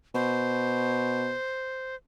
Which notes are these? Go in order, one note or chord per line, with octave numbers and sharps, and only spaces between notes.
B2 C5